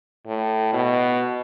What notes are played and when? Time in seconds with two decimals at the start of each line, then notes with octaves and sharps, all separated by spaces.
0.27 A2
0.73 B2